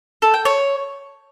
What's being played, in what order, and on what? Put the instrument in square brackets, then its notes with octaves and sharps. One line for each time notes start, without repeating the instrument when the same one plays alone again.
[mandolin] A4
G5
C#5